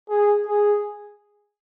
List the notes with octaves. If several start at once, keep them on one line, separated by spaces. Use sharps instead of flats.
G#4
G#4